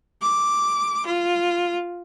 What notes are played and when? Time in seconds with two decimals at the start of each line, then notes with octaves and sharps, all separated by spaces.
0.22 D6
1.06 F4